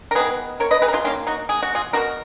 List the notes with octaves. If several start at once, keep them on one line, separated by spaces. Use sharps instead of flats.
A#4
D#3 G#3 B3 G#4 B4
A#4 C#5
B4 D#5
G#4 B4
A#4
F4 G#4
D#3 A#3 C#4 F4
D#4 F#4
G#4
F#4
F4 G#4
B2 G#3 B3 F#4 A#4